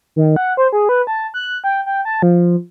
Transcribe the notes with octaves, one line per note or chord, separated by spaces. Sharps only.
D#3
F#5
C5
G#4
B4
A5
F#6
G5
G5
A5
F3